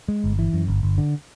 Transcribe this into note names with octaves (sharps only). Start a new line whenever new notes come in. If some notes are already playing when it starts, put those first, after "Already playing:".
G#3
G1
E3
F#2
G1
G1
D3